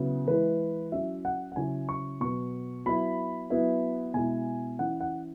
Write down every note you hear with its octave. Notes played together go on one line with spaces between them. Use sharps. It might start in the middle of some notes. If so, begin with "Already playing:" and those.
Already playing: C#3 F#3 B3 E4
E3 G#3 E4 B4
F#3 C#4 E4 E5
F#5
F#5
C#3 F#3 C#4 E4 G#5
C#6
B2 F#3 B3 C#6
F#3 B3 E4 B5
F#3 B3 E4
B2 G#3 E4 G#5
E3 C#4 E4 F#5
F#5